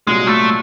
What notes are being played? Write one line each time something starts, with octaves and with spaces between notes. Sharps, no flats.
C2 A#2 F#3 G#3
A3